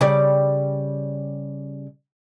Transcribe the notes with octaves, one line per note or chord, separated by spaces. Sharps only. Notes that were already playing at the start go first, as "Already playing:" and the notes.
C#3 G3 D5